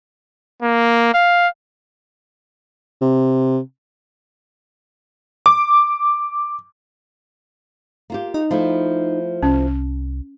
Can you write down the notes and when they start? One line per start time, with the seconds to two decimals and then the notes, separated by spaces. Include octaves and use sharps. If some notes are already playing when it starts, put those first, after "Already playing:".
0.62 A#3
1.14 F5
3.02 C3
5.46 D6
8.10 A#3 F4 G4
8.34 D#4
8.51 F3 A3 E4
9.43 C2 C#4